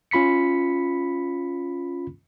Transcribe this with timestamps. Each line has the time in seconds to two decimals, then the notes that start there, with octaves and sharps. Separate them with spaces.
0.11 C#4 F4 B5 B6 C#7